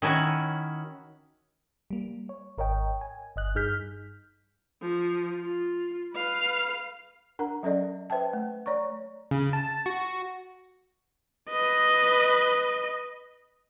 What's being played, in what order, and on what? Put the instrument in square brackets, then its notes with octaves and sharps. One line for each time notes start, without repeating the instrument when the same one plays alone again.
[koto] D#3 C#4 E4 F#4
[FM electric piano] G3 A#3
C#5
G#1 A#4 C#5 D#5 G5
G#5
G1 D#5 F#6
G2 D#4 G#4 F6 G6 B6
[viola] F3
F4
B4 F5
[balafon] D4 A#4 F#5 A#5
F#3 C#4 A4 D5 D#5
B4 C5 E5 G5 A5
A3
C#5 D5 A#5 C#6
[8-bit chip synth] C#3
A5
F#4
[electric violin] B4 D#5